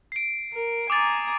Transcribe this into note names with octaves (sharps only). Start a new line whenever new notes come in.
C7 D7
A#4
G#5 A#5 D6 D#6 A6